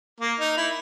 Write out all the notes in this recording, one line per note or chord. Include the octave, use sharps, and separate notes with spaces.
A#3
D#4
E4